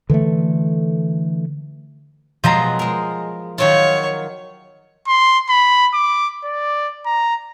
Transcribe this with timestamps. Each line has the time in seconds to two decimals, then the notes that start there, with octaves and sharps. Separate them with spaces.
0.10 D3 E3 G#3 A3
2.44 B2 F3 F#3 G#3 A#5 C7
2.79 G#3 A#4
3.58 D#3 F#3 F4 C#5
5.07 C6
5.49 B5
5.94 D6
6.44 D5
7.06 A#5